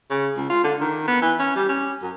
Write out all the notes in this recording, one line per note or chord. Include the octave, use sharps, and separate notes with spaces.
C#3
C#2
F4
D3
D#3
B3
E3
C#4
G3
C#4
F#2